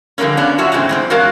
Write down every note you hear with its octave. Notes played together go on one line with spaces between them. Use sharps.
D3 F3 G3 G#3 A#3 C#4
B3 C#4 D4 F5
F#3 F4 F#4 E5
E2 A2 C#3 G#3 C4
E2 G2 C4
F#3 G#3 F#4 A#4 F5